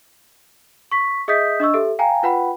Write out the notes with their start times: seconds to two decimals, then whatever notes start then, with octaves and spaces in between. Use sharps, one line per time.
0.92 C#6 B6
1.28 G#4 D#5 E5 D#6 G6 B6
1.60 D4 D#5 C#6 E6
1.74 G4 A4 E5
1.99 F5 G5 G#5 A#5
2.23 F4 B4 F#5 G5 B5